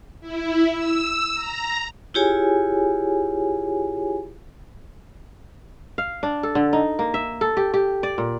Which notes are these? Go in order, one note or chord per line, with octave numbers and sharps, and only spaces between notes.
E4
E6
A#5
E4 F4 G4 G#4 C#5 G#5
F5
D4
A4
D3
D#4
A#3
E5
A4
G4
G4
D5
A#2